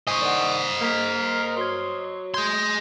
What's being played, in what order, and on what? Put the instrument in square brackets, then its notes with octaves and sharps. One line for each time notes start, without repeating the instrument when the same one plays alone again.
[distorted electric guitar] C5 D#5 [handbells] G#5 C#6
[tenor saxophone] D#3 [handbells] D5 F#5
[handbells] A#3 B6 [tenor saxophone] A#4
[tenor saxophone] F#3 [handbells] C6 G#6
[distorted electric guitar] G#4 C6 [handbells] G6 G#6